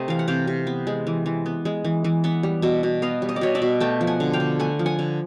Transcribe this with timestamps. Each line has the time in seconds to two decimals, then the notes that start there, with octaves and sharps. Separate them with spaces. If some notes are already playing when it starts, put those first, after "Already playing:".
Already playing: C3 A3 C5 D#5
0.08 E3 F5
0.19 F#5
0.28 C3 F5 G5
0.47 C3
0.67 B3
0.87 G#3
1.07 E3
1.26 E3
1.46 B3
1.65 G#3
1.85 E3
2.04 E3
2.24 B3 E5 F#5
2.43 G3
2.62 B2 E5 F#5
2.83 B2
3.02 B3 D#5 F5
3.22 G3
3.29 D#5
3.36 D5
3.41 B2 C#5 D#5
3.55 D5 E5
3.62 B2
3.80 A3 G5 A5
4.01 F3
4.07 F#5 G#5
4.20 D3
4.33 F5 G5
4.40 D3
4.59 A3 F#5 G#5
4.79 F3
4.86 F#5 G#5
4.99 D3